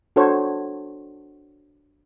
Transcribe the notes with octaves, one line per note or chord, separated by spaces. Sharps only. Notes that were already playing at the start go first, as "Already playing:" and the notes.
D4 F#4 A4 C5 C#5